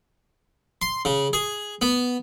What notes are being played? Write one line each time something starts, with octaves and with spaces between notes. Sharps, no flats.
C6
C#3
G#4
B3